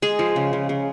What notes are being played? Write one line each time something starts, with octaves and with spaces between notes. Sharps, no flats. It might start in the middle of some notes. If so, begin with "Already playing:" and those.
G#3 G#4
F3
C#3
C#3
C#3